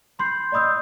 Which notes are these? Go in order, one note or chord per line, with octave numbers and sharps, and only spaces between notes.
B5 C6 G6 C7
D5 D#5 B5 D#6 E6 G6